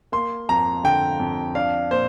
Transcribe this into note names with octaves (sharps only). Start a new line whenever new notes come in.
A#3 C6
F2 A#5
D3 G5
F2
D4 F5
A#2 C5